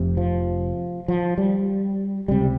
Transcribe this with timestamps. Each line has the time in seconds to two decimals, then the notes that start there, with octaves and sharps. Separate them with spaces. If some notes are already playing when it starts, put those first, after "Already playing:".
Already playing: F1 F2 C3
0.17 F3
1.08 F3
1.38 G3
2.28 C#2 C3 G3